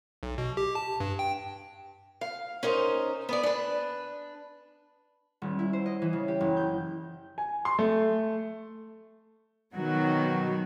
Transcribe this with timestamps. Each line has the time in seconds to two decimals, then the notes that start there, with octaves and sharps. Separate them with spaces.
0.23 B1
0.38 B2
0.57 G4
0.75 A5
1.00 G2
1.19 G5
2.21 F5
2.63 C#4 D#4 A#4 C5
3.29 B3 G#4 D5
3.43 D4 B4
5.42 D#1
5.59 E4
5.73 C5
5.86 D#5
6.02 E3
6.13 C#3
6.28 G4
6.41 F#1
6.57 G6
7.38 G#5
7.65 C6
7.79 A3
9.74 B2 D#3 F#3 F#4